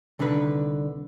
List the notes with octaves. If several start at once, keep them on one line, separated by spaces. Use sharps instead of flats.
C2 D3 D#3 D4 B4